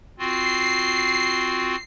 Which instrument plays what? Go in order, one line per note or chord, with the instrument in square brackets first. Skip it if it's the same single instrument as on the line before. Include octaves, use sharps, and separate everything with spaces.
[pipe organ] C4 F4 F#4 [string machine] C7